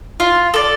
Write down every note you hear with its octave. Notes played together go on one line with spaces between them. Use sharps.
F4
A4 D5